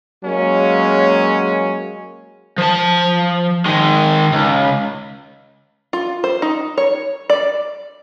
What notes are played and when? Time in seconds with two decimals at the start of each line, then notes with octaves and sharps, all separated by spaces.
0.24 F#3 G#3 A#3 C#4
2.58 F3 A5
3.66 D#3 G#3
4.32 C#2
5.93 F4
6.24 C5
6.42 D#4
6.78 C#5
7.30 D5